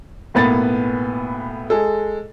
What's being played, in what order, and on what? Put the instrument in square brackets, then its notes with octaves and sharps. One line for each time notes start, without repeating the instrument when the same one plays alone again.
[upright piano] B1 A2 A#3 B3 B4 A6
G#3 G#4 A4